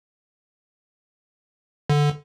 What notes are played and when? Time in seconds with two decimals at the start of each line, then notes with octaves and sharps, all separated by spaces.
1.90 D3